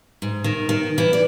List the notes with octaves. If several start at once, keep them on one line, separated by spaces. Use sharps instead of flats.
G#2
D#3
D#3
E3
D5